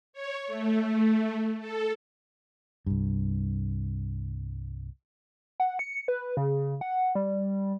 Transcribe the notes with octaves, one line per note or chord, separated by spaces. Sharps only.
C#5
A3
A4
C2 G2
F#5
C#7
B4
C#3
F#5
G3